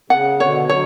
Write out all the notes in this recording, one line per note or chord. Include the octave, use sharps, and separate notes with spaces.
C#3 F#5
B2 D3 C#5
D3 F#3 C#5